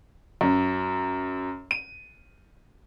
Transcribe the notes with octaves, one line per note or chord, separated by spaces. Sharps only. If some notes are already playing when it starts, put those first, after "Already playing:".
F#2
D#7